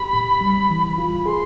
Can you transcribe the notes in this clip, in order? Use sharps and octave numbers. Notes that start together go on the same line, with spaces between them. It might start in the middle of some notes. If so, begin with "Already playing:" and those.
Already playing: G4 B5
A2
G3
E3
F4 B5
G#4 C6